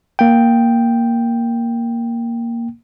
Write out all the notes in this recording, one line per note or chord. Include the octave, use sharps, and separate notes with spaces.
A#3 G5